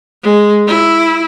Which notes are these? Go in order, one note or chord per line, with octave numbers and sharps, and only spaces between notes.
G#3
E4